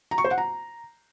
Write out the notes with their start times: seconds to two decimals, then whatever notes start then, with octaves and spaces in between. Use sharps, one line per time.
0.11 A#5
0.18 C#6
0.25 C5
0.31 F#5
0.38 A#5